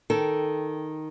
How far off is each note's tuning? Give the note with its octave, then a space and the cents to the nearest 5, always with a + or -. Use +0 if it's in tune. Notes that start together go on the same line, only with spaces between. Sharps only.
D#3 +0 A4 +0 G5 +0